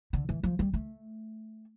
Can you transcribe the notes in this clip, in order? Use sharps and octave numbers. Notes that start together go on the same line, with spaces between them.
D3
E3
F3
G3
A3